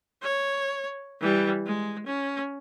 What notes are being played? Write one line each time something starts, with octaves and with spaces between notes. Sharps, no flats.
C#5
E3 G3
G#3
C#4